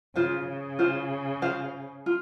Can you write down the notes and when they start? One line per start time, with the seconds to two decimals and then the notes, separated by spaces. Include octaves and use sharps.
0.15 C#3 F4 C5 F5
0.46 C#3
0.79 F4 C5 F5
1.42 F4 C5 F5
2.06 F4